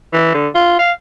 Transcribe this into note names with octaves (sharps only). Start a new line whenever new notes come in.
E3
D3
F4
F5